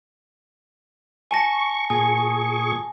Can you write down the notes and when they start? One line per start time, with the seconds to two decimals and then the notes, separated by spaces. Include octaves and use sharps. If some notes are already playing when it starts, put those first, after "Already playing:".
1.31 G#5 A5 C#6 A#6
1.90 A#2 G#4 G#5 C#6